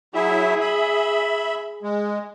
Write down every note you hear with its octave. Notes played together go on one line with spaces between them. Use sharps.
F#3 E4 G#4 E5
E5 B5
G#3